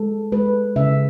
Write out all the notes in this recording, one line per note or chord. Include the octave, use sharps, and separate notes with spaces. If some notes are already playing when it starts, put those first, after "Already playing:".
Already playing: G#3 A4
G#3 B4
C#3 E5